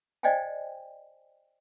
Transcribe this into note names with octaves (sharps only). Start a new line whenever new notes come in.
C5 D5 D#5 F5 G5 G#5